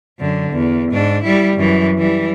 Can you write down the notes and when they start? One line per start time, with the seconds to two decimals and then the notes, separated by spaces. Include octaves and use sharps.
0.20 F#2 D3
0.52 E2
0.92 G#2 D4
1.23 G3 E4
1.56 F#2 E3
1.98 E3 G3